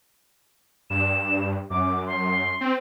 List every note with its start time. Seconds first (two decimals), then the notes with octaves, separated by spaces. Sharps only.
0.90 G2 E7
1.70 F#2 D6
2.06 C6
2.61 C4